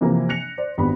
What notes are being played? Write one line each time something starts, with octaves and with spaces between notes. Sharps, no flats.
C3 E3 F3 A#3
F#6 A#6 C#7 F7
C5 D5
G#1 B3 D4 G4 B5